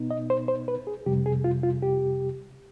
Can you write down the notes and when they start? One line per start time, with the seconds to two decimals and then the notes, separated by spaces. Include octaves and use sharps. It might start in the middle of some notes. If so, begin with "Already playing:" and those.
Already playing: B2 B3 D#4
0.11 D#5
0.30 C5
0.48 C5
0.68 B4
0.87 G#4
1.06 F2 C3 G3 G4
1.26 G#4
1.44 F4
1.63 F4
1.82 G4